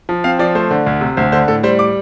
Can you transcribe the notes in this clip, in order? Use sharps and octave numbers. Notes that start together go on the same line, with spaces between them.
F3
C4 F5
F3 D5
A3 C5
D3
D2
C3
D2 C5
D3 C5
A2 A4
G3 C5
D6